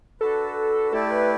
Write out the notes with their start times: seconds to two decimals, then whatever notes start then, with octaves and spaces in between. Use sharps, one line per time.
0.21 D4 F#4 A4 B4
0.92 A3 E4 G4 A4 D5
1.11 B4